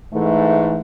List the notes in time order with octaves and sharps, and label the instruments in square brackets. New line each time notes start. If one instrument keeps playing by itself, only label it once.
[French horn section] G#2 E3 A3